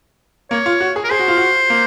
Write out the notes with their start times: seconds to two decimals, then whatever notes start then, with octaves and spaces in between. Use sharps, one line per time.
0.51 A#3 C#5
0.66 F4
0.81 F#4
0.96 G#4
1.04 A#4
1.10 G#4 C5
1.20 F#4
1.28 F4
1.37 F#4
1.70 A#3